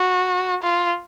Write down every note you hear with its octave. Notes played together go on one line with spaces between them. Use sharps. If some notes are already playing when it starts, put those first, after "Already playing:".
Already playing: F#4
F4